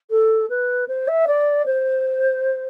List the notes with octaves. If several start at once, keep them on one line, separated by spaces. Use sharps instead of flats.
A4
B4
C5
E5
D5
C5